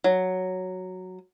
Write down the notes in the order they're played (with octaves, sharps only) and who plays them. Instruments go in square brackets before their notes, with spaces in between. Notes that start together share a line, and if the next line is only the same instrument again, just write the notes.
[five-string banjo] F#3